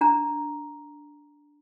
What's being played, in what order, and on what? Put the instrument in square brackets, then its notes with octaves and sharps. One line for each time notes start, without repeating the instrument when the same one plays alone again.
[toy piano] D4 A#5